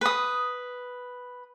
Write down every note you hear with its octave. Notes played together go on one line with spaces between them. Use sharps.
B4 D#6